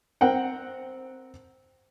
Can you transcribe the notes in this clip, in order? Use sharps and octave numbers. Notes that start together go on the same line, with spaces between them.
C4 A#4 F#5 G5